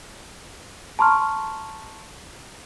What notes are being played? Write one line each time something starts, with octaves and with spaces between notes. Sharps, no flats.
A5 A#5 C6 C#6 F6